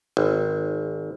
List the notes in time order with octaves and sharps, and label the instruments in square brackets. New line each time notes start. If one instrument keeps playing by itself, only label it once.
[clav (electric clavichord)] G#1